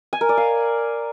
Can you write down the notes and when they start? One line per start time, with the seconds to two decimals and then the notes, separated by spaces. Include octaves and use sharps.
0.13 G#5
0.21 A#4
0.29 D5
0.37 F5